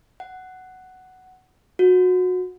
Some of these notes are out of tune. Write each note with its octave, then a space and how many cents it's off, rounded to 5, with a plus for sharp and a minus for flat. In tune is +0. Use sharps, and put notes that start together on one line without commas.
F#5 +5
F#4 -20